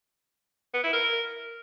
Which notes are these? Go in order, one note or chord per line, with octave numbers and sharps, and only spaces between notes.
B3
E4
A#4